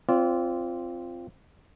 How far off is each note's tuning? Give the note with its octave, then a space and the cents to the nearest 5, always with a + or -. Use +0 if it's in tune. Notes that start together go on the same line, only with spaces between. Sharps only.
C4 +0 F4 -10 D5 -30